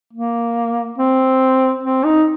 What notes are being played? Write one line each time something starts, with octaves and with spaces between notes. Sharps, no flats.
A#3
C4
C4
D#4